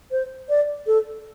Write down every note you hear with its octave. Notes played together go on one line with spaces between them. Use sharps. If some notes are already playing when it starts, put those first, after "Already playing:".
C5
D5
A4